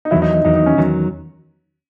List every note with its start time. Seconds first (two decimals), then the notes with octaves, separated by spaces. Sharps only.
0.05 D#4
0.11 E2 D#3 F#3 E4
0.22 D#4
0.33 D#4
0.45 E2 D#3 F#3 D#4
0.55 D#4
0.66 C#4
0.77 E2 D#3 F#3